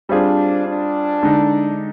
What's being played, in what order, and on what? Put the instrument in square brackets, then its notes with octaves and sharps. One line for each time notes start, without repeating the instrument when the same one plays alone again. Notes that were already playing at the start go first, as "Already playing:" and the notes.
[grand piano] G3 C4 F4 G#4 C5 [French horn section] D4
[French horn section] D4
[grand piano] D3 G#3 D#4